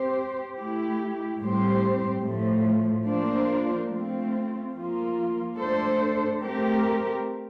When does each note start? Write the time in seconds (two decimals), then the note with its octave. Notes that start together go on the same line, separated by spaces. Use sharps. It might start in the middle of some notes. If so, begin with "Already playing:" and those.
Already playing: C4 G4 C5
0.57 A3 E4 G4
1.39 A2 G3 C4 G4 C5
2.23 A2 F3 A3
3.07 F3 A#3 D4 F4 C5
3.90 A3 C4 F4
4.74 F3 A#3 F4
5.57 A3 D4 A4 C5
6.41 A3 C4 G4 A#4